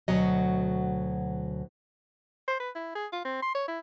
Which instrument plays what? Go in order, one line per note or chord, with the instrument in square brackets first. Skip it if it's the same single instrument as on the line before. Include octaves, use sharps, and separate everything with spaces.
[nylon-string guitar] D2 B2 F#3 D#5
[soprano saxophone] C5
B4
E4
G#4
F4
C4
C6
C#5
E4